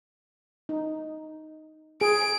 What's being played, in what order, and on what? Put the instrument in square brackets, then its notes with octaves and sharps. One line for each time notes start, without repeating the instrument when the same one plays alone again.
[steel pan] D#4
[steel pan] G#4 [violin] D7